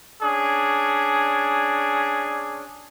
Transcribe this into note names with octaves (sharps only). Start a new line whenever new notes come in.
C#4 D4 G#4